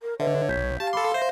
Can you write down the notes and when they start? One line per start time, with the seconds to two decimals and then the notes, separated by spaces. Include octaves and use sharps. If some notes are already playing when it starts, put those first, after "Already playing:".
0.02 A#4
0.20 D3 B4 C#5 D#5 E5
0.49 B1 G6 B6
0.80 G4 F5 A5
0.93 A4 B5 C6 D6
1.14 C5 E5 A#6